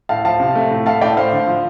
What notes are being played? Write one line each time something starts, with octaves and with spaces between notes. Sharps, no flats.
A2 F5 A5
F3 F5 A5
C3
A3
A2
A3 F5 A5
A2 D5 G5
A3 C5 F5
D3
F3